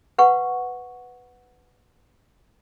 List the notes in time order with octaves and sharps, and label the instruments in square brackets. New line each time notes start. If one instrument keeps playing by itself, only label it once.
[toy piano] B4 F#5 C#6